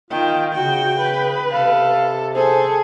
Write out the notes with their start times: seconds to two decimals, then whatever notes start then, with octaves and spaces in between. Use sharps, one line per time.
0.11 D#3 F4 G5
0.55 C#3 F#4 G5
0.98 B4 B5
1.51 C3 A4 F5
2.35 G#4 A4 C5 G#5